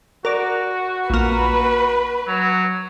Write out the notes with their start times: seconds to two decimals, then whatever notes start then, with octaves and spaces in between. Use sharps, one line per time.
0.25 F#4 A#4 D5
1.10 A#1 A#3 B4
2.27 F#3